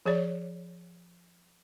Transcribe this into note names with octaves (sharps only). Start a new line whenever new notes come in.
F3 G#4 C#5 D5